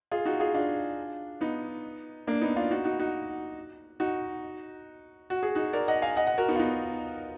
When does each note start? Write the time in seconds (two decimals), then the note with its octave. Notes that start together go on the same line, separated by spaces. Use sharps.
0.11 F4 G#4
0.25 D#4 F#4
0.40 F4 G#4
0.54 D4 F4
1.41 B3 D#4
2.27 A#3 D4
2.41 B3 D#4
2.56 D4 F4
2.71 D#4 F#4
2.84 D#4 F#4
3.00 D#4 F#4
4.00 D#4 F#4
5.30 F#4
5.43 G#4
5.55 D#4 F#4
5.73 A#4 D5
5.88 D#5 F#5
6.02 F5 G#5
6.16 D#5 F#5
6.27 D#5 F#5
6.38 F#4 A#4
6.48 B3 D#4
6.55 F4
6.59 B3 D#4